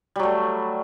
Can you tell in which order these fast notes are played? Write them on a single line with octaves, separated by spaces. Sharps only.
G3 F#3 A3